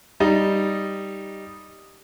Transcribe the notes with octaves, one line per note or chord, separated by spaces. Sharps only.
G3 D#4